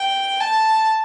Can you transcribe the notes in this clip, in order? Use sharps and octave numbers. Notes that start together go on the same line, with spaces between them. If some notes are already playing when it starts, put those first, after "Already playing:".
Already playing: G5
A5